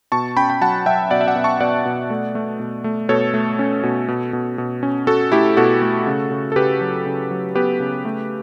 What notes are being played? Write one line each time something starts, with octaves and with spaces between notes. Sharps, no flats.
B2 A5 C#6
C#4 G5 B5
G5
F#3 F#5 A5
F#3 E5 G5
B2 D5 F#5
E5
D5 F#5
B2
A5 C#6
B2 D5 F#5
B2
A3
A3
B2
A3
B2 A4 C#5
A3
C#4
B2
B2
B2
B2
C#4
C#4 F#4 A4
A3 E4 G4
B2 F#4 A4
A3
C#3
C#3
A4
C#3 G4 B4
F#3
C#3
F#3
B3 G4 B4
C#3
A3